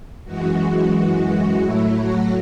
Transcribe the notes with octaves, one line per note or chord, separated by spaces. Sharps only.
F#2 E3 G#3 F#4
A2 F#3 A3 E4
F#4